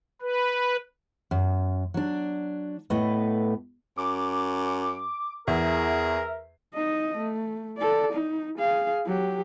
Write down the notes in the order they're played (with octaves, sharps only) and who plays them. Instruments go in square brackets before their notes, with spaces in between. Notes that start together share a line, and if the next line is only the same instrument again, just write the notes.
[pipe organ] B4
[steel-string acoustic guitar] F#2
F#3 D4
A2 A3 B3 B4 D#5
[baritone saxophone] F#2 [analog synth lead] D6
[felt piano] E2 [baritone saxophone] G#4 [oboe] A#4 [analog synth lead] E5
[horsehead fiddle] D#4 D#5
A3
A4 D5
D#4
G#4 F5
F#3 G4